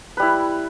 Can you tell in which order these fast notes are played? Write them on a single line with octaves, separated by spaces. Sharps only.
B4 G3 E4